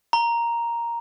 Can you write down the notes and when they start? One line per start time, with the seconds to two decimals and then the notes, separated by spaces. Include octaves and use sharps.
0.13 A#5